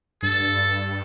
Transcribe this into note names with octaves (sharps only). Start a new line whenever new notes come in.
G2 A4